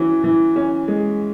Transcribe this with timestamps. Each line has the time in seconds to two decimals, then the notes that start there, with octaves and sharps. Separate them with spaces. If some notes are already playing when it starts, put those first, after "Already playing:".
Already playing: E3 C#4 F#4
0.24 E3
0.56 C#4
0.88 G#3